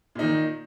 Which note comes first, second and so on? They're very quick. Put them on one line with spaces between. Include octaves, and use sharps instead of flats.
A#2 D#4 D#3